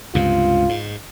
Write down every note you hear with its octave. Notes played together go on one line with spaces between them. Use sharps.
C#2 G2 C3 F4
G#2